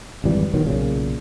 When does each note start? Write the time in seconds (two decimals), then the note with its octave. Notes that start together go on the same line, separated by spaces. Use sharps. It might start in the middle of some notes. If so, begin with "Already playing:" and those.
0.24 G#1 F2 E3 G3
0.54 B1 B2 D#3 F#3
0.65 B1 A#2 C#3